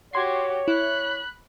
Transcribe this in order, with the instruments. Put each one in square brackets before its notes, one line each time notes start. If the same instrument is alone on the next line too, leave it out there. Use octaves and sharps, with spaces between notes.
[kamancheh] F#4 G4 [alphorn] C#5 [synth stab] C6 G#6 C7
[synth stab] E4 [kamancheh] B5 F#6